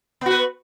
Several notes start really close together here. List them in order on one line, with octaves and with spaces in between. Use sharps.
B3 F#4 B4